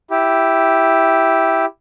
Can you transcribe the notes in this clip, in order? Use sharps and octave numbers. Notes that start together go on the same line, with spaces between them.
E4 G4